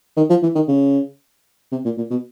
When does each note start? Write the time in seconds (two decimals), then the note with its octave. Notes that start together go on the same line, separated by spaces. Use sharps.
0.17 D#3
0.30 F3
0.43 E3
0.55 D#3
0.68 C#3
1.72 C3
1.85 A#2
1.98 A#2
2.11 B2